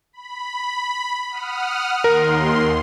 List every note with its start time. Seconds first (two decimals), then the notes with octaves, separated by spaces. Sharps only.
0.13 B5
1.30 F#5 D#6 F6
2.04 D#2 A#4 C6